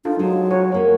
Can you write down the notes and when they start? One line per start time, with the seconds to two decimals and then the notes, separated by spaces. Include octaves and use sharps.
0.05 D4 D#4 F4 A4
0.19 F#3 G#3 C5
0.51 F#4 C#5
0.72 G#3 A#3 C#4 C#5